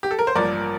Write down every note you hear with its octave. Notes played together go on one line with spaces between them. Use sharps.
G4
A4
A#4
C5
A1 G2 F3 A#3 A#4 D5